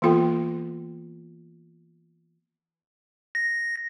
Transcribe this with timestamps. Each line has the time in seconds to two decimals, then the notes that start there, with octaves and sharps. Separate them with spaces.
0.02 E3 A#3 B3 F4 A4 G5
3.35 A#6